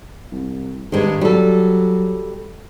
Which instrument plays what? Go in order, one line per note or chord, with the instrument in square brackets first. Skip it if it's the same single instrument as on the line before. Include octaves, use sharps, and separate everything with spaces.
[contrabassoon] C2
[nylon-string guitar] G2 G#3 [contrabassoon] D#3
[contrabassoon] F#3 [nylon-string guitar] G3 A4